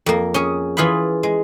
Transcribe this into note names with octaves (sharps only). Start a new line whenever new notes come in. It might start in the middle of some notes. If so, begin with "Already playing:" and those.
F2 A#3
C#4 G#4
E3 F4 G#4 F5 B5
G#3